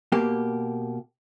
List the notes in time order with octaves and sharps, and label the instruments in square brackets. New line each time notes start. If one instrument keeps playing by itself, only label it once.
[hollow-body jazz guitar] B2 A#3 G4